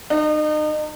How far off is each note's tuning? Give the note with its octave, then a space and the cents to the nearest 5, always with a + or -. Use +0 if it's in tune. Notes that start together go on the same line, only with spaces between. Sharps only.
D#4 -35